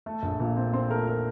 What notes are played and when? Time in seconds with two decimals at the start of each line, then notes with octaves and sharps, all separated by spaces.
0.06 A3 A4
0.23 A#1
0.40 A#2
0.57 C4
0.73 C4 C5
0.91 A3 A#4
1.07 A#4